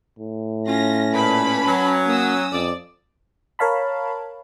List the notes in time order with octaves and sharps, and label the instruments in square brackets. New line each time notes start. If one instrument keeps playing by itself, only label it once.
[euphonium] A2
[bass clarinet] C#4 [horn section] F4 [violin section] A#6
[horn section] A#2 [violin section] B4 A5 B5
[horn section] F#3
[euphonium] A#3 [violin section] D#6 E6
[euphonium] F2 [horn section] D5
[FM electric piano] A#4 C#5 F5 A5 B5